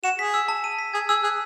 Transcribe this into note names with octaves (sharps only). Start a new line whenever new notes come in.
F#4 E7
G#4 B6
E6
A5
D#7
B6
G#4 G#6
G#4 E6
G#4 F#6